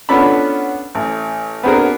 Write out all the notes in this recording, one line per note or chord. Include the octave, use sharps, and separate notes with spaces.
B3 C#4 D4 F4 A4 B5
A1
B3 C4 D4 F#4 G#4 A#4